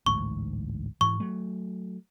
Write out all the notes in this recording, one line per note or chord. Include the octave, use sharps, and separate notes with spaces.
A1 D2 G#2 C#6
G#2 E3 C#6
F#3 A3